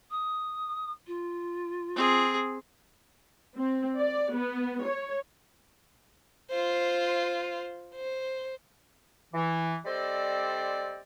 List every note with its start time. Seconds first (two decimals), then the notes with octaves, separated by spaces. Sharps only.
0.11 D#6
1.07 F4
1.96 C4 G#4
3.57 C4
3.98 D5
4.34 B3
4.85 C#5
6.51 F4 C5
7.95 C5
9.33 E3
9.85 G3 C4 A4 C5 D5 D#5